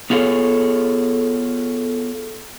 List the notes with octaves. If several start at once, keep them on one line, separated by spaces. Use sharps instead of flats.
B3 F4 G#4 A4 C#5